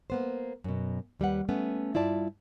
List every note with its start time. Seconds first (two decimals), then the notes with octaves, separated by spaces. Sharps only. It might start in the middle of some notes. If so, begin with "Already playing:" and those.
0.10 A#3 B3 C5
0.64 F#2 B2
1.20 D#2 G3 B4 F#5
1.49 A3 B3 C#4
1.94 G2 E4 F4 D5 A5